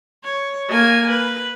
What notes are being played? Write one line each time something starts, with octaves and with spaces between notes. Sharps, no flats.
C#5
A#3 G#5
B4